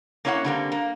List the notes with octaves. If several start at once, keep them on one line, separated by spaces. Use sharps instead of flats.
A#3 C#4 E4 C#5 E5 F#5
D3 G3 A#3 C4
A#3